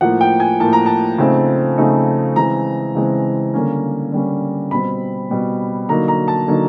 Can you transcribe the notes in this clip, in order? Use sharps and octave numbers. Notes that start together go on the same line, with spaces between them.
A2 F3 A#3 F#5
G5
G#5
A2 F3 A#3 A5
A#5
A5
C#3 F3 A3 C4 D#4
C#3 F3 A3 C4 D#4
C#3 E3 G#3 C4 A#5
C#3 E3 G#3 C4
D3 G3 A#3 C#4
D3 G3 A#3 C#4
B2 G3 C4 B5
B2 G3 C4
D3 F#3 A#3 D#4 A#5
A#5
A5
D3 F#3 A#3 D#4